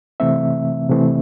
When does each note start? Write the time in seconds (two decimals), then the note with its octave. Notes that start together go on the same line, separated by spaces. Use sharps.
0.20 C3 E3 A3 C4 E5
0.89 C3 E3 A3 C4